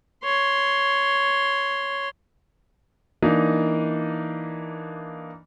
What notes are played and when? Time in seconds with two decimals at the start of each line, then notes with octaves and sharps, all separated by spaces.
0.24 C#5 C6
3.22 E3 A#3 D4 D#4 D#5